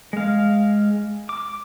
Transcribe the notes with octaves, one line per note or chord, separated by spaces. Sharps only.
G#3 F5
D6